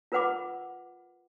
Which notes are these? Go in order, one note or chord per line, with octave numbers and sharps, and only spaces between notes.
F4 A#4 B4 F#5 B5 D6